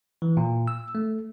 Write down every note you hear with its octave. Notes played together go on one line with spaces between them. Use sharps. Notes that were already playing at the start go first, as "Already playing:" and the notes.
E3
A#2
E6
A3